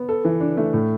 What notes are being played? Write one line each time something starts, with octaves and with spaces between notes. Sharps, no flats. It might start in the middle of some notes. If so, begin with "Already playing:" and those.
Already playing: B3
A4
E3
D4
A3
A2